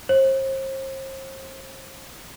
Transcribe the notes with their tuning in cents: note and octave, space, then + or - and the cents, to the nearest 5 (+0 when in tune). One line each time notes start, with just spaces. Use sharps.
C5 +35